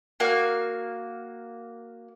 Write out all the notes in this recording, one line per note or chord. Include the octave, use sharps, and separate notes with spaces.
A#3 F#4 F5